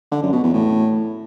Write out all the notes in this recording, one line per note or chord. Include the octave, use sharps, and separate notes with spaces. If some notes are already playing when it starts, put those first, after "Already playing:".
D3
F#2
B2
E2
A2